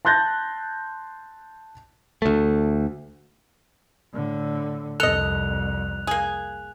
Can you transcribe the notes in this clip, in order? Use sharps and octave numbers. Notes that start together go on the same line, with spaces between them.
A5 C6 F#6 G6 A6 A#6
D2 A3
A2 D3
C2 F2 A4 D#5 F#6 F7
A#3 G#4